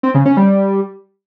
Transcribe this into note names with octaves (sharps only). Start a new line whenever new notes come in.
C4
C#3
C#4
G3